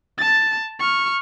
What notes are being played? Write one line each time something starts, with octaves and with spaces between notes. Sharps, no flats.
A5 A6
C#6 F6